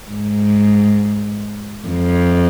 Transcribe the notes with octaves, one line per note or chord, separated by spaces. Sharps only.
G#2
F2